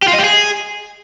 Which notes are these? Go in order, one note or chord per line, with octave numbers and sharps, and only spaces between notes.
G4
F4
D#5
G4
G#4